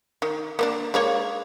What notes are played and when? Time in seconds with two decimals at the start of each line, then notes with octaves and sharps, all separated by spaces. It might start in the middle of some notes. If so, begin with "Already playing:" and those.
0.22 D#3
0.59 A#3 B3 D4
0.94 G#3 A#3 C#5